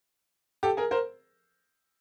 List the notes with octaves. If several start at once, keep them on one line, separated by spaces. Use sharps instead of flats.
G4 A4
G#4 A#4
A#4 C5